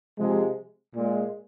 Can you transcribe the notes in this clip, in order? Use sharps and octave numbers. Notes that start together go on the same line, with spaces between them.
C3 F3 G#3
A#2 G#3